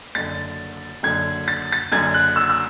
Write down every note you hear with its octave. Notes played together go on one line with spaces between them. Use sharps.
F#1 F#2 D3 A6
F#1 F#2 D3 G#6
A6
A6
F#1 F#2 D3 G#6
F#6
E6
E6